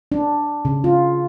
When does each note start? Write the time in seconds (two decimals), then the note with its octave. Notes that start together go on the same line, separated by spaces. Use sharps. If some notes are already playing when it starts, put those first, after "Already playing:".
0.12 D4
0.65 C#3
0.84 F4